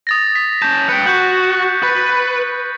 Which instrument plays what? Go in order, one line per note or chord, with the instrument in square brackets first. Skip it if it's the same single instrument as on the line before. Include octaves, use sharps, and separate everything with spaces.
[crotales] D#6 A6 A#6
B6
[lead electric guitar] C#4 A5 [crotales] G6
[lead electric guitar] B4 G5 [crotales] C#7
[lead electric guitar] F#4 [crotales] C#6 F#6 G6
[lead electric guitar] B4 [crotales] A6